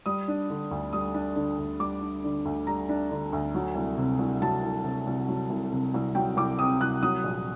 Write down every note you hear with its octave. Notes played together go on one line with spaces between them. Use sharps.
G3 D#6
D4
D3
D2
G3 D#6
D4
D3
D2
G3 D6
D4
D3
D2
G3 A#5
D4
D3
D2
F#3
C2
C3
C2
F#3 A5
C2
C3
C2
F#3
C2
C3
C2
F#3 G5
C2 D6
C3 D#6
C2 F#6
F#3 D#6
A#1